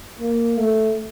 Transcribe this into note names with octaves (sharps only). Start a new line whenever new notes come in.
A#3
A3